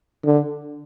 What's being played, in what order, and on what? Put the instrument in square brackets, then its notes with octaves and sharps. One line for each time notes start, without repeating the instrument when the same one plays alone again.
[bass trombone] D3